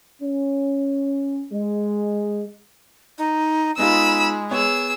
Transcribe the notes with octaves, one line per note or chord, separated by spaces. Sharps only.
C#4
G#3
D#4
G#3 B3 D#4 F4 B5 E6
B3 G#4 C#5 E6